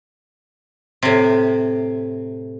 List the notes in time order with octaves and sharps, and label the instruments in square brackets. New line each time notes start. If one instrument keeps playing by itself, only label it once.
[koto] A2 C3